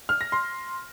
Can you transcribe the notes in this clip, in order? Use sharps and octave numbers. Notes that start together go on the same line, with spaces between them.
F6
A#6
C6